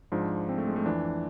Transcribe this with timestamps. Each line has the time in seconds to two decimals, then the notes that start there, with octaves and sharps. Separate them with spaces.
0.12 G#2 F3 D4
0.49 C4
0.58 A3
0.67 G#3
0.76 A3
0.86 F2 E3 D4